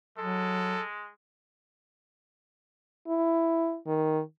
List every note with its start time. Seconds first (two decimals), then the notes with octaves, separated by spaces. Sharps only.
0.18 F#3 G#3 A4
3.07 E4
3.87 D#3